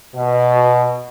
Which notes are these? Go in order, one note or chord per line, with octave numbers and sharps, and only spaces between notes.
B2